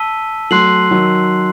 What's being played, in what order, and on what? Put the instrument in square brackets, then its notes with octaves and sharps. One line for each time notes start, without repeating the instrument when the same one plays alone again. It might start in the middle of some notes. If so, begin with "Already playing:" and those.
Already playing: [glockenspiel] A5 E6 B6 D#7 G7
[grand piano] F#3 A3 [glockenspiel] C6 F#6 C7 F#7
[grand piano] D#3 F#3